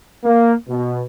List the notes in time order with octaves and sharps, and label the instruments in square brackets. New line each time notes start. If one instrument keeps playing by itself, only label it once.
[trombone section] A#3
B2